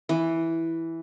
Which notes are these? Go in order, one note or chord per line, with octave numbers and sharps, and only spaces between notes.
E3